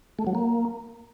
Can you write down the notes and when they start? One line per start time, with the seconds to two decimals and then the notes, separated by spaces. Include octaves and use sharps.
0.19 A3
0.27 F#3
0.35 A#3